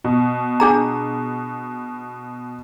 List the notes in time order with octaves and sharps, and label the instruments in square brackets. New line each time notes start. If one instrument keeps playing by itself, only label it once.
[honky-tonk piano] B2
[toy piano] D4 G#4 A#5